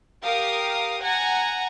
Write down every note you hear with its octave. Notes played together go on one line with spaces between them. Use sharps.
G4 A#4 F5 D#6
F#5 G#5 A#5